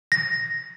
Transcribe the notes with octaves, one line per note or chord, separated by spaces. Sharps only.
A#6